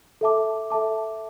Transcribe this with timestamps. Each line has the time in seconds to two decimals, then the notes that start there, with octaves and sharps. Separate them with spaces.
0.21 A4 E5 A5 D6
0.70 A4 E5 A5 D6